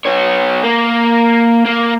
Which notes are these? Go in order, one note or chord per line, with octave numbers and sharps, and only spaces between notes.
B3 C#5
A#3
A#3